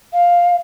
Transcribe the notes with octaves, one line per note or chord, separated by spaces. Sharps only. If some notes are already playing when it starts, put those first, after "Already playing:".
F5